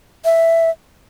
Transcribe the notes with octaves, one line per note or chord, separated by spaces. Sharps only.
E5